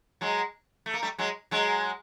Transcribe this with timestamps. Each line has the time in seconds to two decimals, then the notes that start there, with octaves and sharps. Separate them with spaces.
0.21 F#3 G#3
0.86 A3
0.94 A#3
1.02 G3 A3
1.18 F#3 G#3
1.51 F#3 G#3